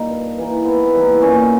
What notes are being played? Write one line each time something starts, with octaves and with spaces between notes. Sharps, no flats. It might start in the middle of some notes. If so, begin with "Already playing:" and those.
Already playing: A#2 G3 A#3 D#4
G2
E3 G3 A#3
G#2 B3
E3 G3 A#3
A#2 C#4